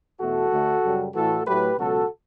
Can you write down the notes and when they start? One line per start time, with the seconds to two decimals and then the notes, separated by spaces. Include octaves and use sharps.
0.20 E2 B2 A3 F#4 A4
0.51 D2 D3 A3
0.83 F#2 C#3 G3
1.15 A2 E3 A3 F#4 A4
1.46 A2 F#3 A3 G4 B4
1.78 C#2 B2 F#3 F#4 A4